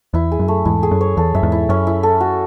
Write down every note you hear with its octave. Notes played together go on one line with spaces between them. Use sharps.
E2 E4
G#4
F#2
A3
E2 G#2 E4
G#4
F#2
C#5
E2 A4
F#2 E5
E2 G#2
E4
F#2 C#4
E4
A4
F#4